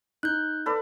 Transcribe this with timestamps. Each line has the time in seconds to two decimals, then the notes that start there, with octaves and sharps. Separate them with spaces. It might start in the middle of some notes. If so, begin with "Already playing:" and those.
0.23 D#4 F#6 G6
0.66 A4 B4 D5